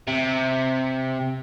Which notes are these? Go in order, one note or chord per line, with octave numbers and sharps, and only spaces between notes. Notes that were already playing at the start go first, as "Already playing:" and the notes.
C3